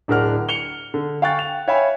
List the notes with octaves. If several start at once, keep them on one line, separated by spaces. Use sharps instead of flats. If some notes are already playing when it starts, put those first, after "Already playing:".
D1 D4 G#4 A#4 F#5 F6
C#7 F7 G7
D3
F5 G5 G#5 C#6 F#6 A6
F7
C#5 E5 F5 G5 G#5 B5